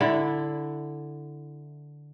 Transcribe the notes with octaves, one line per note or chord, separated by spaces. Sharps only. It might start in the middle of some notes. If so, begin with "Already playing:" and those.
D3 E4